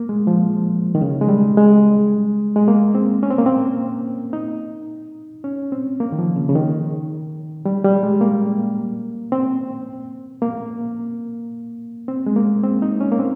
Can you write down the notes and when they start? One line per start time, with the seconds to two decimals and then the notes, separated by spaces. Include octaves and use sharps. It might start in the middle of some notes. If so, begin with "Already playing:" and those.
Already playing: A#3
0.09 G#3
0.27 F3
0.95 D#3
1.01 C#3
1.21 G#3
1.29 G3
1.57 G#3
2.56 G#3
2.68 A#3
2.95 C4
3.23 C#4
3.30 C4
3.38 A#3
3.46 C4
4.33 D#4
5.44 C#4
5.72 C4
6.00 A#3
6.12 D#3
6.19 F3
6.36 C#3
6.49 C#3
6.56 D#3
7.65 G3
7.84 G3
8.03 G#3
8.21 A#3
9.32 C4
10.42 A#3
12.08 C4
12.26 G#3
12.36 A#3
12.64 C4
12.82 D#4
13.01 C#4
13.12 A#3
13.19 C4